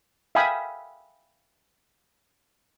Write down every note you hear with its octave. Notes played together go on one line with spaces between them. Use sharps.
E5 F5 G5 G#5 B5 D#6